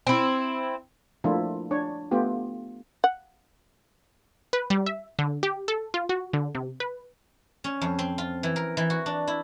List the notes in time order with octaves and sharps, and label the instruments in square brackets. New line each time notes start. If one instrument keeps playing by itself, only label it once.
[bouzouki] C4 E4
[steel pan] F3 A3 A#3 D4 E4 F4
D4 C#5
A3 B3 F4 G4
[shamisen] F#5
[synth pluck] B4
G3
E5
D3
G4
A4
F4
F#4
D3
C3
B4
[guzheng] C#4
F2
C4
F4
E3
A#4
E3
F#4
D4
E4